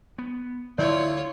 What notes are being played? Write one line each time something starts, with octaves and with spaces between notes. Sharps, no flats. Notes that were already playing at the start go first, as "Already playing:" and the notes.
B3
D2 D3 E4 F4 C#5 D5